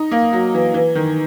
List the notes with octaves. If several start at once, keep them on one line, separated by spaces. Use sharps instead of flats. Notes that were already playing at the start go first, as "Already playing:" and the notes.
Already playing: D#4
A#3
F#3
E3
E3
D#3